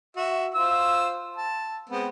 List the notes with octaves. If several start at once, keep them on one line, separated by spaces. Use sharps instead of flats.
F#4 E5
F4 C5 E6
A5
G#3 B3 C4